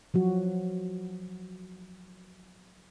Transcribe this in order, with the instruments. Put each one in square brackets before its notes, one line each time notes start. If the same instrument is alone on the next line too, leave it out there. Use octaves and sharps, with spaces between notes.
[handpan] F3 F#3 F#4